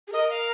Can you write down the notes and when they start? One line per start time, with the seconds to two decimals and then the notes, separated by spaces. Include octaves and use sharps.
0.08 G#4
0.12 A#4 D#5
0.29 F5